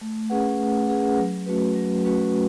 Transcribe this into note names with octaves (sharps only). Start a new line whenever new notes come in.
A3
C#4 G#4 B4 F#5
A3
C#4 G#4 B4 F#5
F#3
A3 C#4 F#4 B4
F#3
A3 C#4 F#4 B4